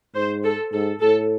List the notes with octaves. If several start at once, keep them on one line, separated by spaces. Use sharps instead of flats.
G#2 C5
A4
G#2 A4
A2 A4